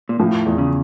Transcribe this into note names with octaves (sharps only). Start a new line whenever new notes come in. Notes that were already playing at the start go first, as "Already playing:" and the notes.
A#2
A2 F3
E2
C#3